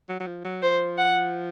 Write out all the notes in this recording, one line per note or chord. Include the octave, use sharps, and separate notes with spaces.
F#3
F#3
F3
F#3
F3 C5
F#5